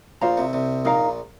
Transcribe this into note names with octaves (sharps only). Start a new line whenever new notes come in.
A#1 A#2 F4 C5 F5 A#5
C2 C3
C2 C3
A#1 A#2 D#4 A#4 F5 A#5